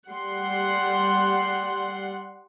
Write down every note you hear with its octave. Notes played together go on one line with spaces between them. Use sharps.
G3 F#5 C6